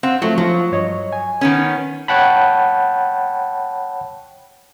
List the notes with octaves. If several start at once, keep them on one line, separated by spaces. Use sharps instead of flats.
C4 F5 F#5 C6
F3 F#3 A3
F3 F#3 F4
G2 C#5 D#5
G#5
D#3 B3 C#4
C#5 F#5 G5 A5 B5